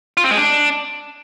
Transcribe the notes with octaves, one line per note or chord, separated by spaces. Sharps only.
F4
C4
G#3
D4